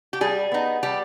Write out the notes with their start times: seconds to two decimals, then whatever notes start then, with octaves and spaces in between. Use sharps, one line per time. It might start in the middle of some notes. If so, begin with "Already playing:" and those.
0.13 G4
0.21 G3 G#4
0.52 B3 D#4
0.83 G3 G4